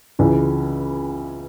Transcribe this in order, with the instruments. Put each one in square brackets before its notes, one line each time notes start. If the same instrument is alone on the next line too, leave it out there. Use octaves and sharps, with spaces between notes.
[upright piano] C#2 C#3 E3